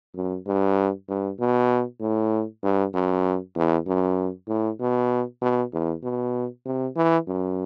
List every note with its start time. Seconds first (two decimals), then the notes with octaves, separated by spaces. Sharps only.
0.15 F#2
0.47 G2
1.08 G2
1.40 B2
2.00 A2
2.63 G2
2.94 F#2
3.56 E2
3.87 F#2
4.48 A2
4.79 B2
5.42 B2
5.73 E2
6.03 B2
6.65 C3
6.96 E3
7.27 F#2